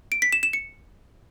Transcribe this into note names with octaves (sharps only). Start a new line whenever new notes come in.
D7
B6
E7
E7
C#7